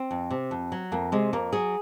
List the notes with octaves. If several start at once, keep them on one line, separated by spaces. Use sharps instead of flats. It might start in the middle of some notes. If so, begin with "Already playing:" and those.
Already playing: C4
F2
C3
F2
F#3
F2 A#3
C3 G#3
F2 A#3
F#3 G#4